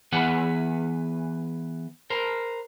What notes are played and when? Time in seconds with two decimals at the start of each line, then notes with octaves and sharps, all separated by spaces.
0.12 E3 B3 G#4 B4 F#5
2.10 A#4 C5